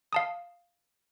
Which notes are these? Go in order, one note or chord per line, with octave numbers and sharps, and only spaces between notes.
F5 A5 D#6